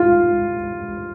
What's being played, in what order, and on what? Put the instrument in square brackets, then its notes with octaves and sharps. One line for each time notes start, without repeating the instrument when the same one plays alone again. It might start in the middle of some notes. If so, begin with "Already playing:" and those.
Already playing: [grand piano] F4